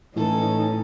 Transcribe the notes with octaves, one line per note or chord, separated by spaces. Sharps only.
A2 E3 C#4 D#4 A4 B4